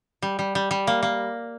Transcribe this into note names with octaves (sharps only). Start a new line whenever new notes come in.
G3
G3
G3
G3
A#3
A#3